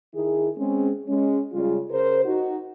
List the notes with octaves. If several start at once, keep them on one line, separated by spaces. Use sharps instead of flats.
D#3 E4 G#4
G#3 C4 C#4
G#3 C#4
C#3 G3 G#3 C#4 F4
C#3 A#4 C5
D#4 F#4